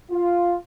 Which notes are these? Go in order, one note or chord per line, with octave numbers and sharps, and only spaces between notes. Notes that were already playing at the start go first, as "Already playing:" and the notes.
F4